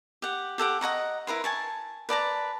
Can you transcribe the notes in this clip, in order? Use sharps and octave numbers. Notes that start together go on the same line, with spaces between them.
G4 F#5
G4 A4 F#5 D6
D#5 F#5 A#5 C#6
E4 A#4 B4 C6
G#5 A5 C#6
B4 D5 A5 A#5